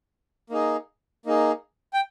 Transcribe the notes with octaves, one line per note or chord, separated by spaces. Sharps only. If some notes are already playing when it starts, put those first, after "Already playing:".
A#3 D#4 G#4
A#3 D#4 G#4
G5